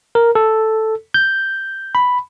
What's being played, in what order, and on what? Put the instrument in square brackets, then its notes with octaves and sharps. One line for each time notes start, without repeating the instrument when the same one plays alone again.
[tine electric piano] A#4
A4
G6
B5